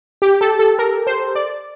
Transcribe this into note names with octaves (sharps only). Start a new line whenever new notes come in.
G4
A4
A4
A#4
C5
D5